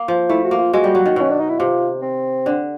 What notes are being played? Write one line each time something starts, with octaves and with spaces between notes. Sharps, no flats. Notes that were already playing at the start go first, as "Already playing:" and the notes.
Already playing: A#3
F3
A3 E4
F#4
A#3
F4
G#3 F#4
G3
F#3
D#3
B2
C#4
D4
D#4
E4
C3 F4
C4
D3